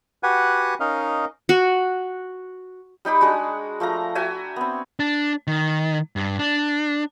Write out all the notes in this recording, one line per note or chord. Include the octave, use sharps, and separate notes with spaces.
F#4 G4 B4 F#5 G#5
C#4 D#4 A#4 D#5 F5
F#4
G3 D#4 G4 B5
G#3 D4 F#4 G#4
F3 A3 F5 A#5
F#4 E5 G5 G#5
B3 C4
D4
D#3
G2
D4